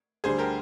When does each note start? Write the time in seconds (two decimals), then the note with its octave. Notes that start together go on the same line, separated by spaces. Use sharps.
0.24 D2 D3 G3 G#4 C5
0.39 G4 A#4